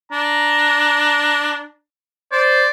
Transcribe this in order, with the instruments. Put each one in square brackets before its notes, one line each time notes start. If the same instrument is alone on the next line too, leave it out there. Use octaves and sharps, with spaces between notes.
[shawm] D4 [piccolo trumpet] A#5
[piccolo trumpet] C5 [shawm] D5